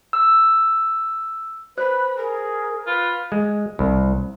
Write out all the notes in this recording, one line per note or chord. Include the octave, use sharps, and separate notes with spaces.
E6
B4 C5 B5
G#4 A#4
F4 B4
G#3
C2